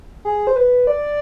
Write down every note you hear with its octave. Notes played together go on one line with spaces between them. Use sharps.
G#4
C5
B4
D5